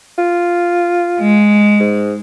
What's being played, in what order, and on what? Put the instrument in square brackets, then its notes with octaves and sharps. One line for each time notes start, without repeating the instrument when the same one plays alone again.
[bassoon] F4
[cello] G#3
[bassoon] G#2